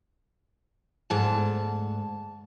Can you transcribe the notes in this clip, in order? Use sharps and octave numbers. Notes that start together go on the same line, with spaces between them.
D2 G#2 A5